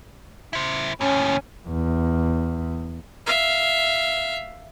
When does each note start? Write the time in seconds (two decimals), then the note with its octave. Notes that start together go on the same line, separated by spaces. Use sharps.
0.53 E4 C5
1.01 D#2 A2 C#4
1.68 E2
3.26 E5 F5